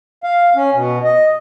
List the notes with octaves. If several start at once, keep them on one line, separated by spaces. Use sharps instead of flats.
F5
C#4
B2
D#5